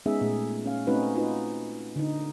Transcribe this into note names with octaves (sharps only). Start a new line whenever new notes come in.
G#3 B3 C#4 D#4 G#4 E5
A#2 A3 G#4
C#4 F5
A3 C4 C#4 D#4 F#4 B4
D#4 F4 F#4 B4
D3 D#4